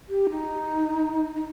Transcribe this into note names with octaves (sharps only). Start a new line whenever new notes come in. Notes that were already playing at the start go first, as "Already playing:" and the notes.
G4
D#4
D#4